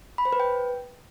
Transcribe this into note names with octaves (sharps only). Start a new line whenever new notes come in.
B5
C5
B4
G5